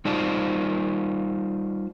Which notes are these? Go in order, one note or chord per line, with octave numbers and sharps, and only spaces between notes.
G3 D#4 F4 C5 D5 A5